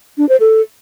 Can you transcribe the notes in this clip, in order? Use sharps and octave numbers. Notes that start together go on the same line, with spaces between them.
D4
C5
A4